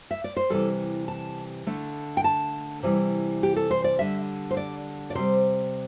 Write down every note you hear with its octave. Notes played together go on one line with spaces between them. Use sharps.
E5
D5
C5
C3 E3 G3 A4
A5
D3 A3
G5
A5
C3 E3 G3
G4
A4
C5
D5
D3 G3 E5
C5
D5
D5
C3 G3 C5